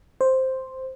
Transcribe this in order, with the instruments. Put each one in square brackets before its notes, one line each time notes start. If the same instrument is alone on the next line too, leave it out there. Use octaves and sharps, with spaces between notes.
[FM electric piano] C5